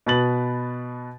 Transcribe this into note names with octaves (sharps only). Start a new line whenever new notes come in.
B2 B4 B5 A6 F#7